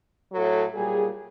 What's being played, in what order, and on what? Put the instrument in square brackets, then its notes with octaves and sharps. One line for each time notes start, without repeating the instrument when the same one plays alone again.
[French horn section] A2 F#3 A4
A#2 G3 G#4